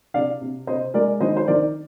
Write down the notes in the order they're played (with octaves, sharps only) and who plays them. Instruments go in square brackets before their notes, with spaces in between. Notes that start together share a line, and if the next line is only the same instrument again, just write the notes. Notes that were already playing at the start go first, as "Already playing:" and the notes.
[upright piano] C3 D5 F5
C3
C3 C5 D#5
G#3 A#4 D5
D#3 C5 D#5
C5
D#3 A#4 D5